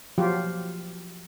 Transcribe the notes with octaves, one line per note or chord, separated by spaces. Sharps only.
F3 F#3 F4 G4